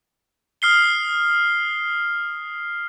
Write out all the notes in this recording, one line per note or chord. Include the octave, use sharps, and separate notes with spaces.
D#6 F6 C7 G7